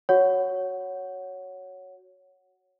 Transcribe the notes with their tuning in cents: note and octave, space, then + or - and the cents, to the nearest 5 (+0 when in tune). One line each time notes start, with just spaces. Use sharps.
F#4 +0 C#5 +0 F#5 +0